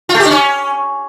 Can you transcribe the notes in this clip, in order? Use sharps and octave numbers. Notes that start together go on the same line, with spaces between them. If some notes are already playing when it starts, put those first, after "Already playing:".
F4
A3
G4
D4
C#4